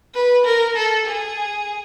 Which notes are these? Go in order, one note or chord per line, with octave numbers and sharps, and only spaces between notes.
B4
A#4
A4
G#4